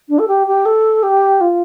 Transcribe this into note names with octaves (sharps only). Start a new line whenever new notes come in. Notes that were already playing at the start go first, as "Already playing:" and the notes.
D4
A4
G4
G4
A4
G4
F4